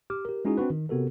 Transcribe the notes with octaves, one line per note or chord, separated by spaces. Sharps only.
G4 D6 F6
G4 A#4
G#3 C#4 D#4 E4 F#4 G#4
C4 D4 F#4 B4
D#3
C3 B3 F#4 A4 A#4